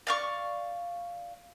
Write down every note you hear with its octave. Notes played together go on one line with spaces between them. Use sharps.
D5 F5 C#6